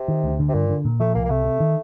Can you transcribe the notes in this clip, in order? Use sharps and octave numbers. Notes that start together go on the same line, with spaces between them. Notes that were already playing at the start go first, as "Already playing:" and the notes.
Already playing: C3
D#3
D2
D3
C3
G2 A#2
D3
A#2
F3 A3
C2 A#3
A#3
C3 A3
C3
D#3